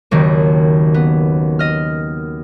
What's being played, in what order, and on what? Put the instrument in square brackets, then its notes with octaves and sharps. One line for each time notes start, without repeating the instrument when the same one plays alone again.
[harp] F#1 D#2 D#3
B3
D#5 F6